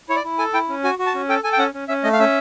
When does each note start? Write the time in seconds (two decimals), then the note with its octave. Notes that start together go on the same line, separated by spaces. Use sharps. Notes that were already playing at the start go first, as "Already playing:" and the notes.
0.09 E4 C#5
0.16 D5
0.24 E4
0.38 A4 G#5
0.54 E4 G5
0.69 C#4
0.84 F#4 G#5
0.99 F#4
1.06 A5
1.14 C#4
1.29 A4 G5
1.44 A4 G#5
1.53 G5
1.58 C#4 F#5
1.74 C#4
1.88 C#4 E5
2.04 A3 D#5
2.13 F5
2.19 C#4 E5